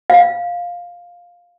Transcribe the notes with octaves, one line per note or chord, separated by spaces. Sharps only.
F5